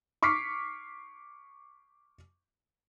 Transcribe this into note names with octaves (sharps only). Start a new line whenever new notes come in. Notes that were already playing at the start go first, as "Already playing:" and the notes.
C#6 D6 F6 B6 C7